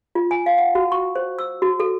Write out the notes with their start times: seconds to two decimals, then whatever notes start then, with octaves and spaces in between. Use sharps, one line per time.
0.15 F4
0.31 G#5
0.46 F5
0.58 F#5
0.75 F#4
0.92 C#6
1.16 C5
1.39 E6
1.62 F#4
1.80 A4